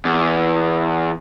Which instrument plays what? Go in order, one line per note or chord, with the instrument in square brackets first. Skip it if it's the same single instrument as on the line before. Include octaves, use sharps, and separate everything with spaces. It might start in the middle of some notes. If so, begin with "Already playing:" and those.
[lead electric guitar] E2